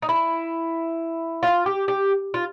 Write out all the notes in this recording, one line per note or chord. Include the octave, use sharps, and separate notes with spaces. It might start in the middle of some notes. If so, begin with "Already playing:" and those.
D#4
E4
F4
G4
G4
F4